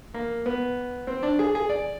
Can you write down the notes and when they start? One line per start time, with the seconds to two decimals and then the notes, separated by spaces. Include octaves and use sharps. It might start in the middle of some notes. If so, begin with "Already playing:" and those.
0.14 A#3
0.46 B3
1.07 C4
1.23 D4
1.39 G#4
1.55 G#4
1.69 D5